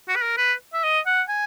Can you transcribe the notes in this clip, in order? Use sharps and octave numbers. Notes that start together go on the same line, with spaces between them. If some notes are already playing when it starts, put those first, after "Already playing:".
F#4
B4
A#4
B4
E5
D#5
F#5
G#5